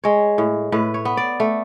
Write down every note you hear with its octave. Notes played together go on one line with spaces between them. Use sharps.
G#3 C#5
A2
A2 B4
C#5
B3
D5
A3